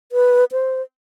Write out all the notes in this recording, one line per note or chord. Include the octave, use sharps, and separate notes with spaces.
B4
C5